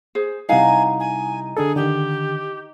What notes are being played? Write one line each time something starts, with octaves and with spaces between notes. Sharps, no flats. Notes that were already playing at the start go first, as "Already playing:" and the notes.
G#4 C5
C3 G3 D#4 E4 F5 F#5 G#5 A#5
G#5
D3 D4 G#4 A4
D3 D#3 G4